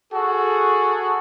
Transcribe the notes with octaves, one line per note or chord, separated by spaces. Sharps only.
F#4 G#4 A4